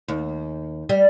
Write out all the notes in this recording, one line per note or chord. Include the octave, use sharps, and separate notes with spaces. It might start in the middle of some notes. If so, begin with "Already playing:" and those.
D#2
G3